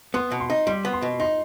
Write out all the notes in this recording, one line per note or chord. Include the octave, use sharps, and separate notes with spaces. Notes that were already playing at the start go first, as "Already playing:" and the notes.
B3 C6
B2
C6
D#4
G3 C6
B3
C6
B2
D#4 C6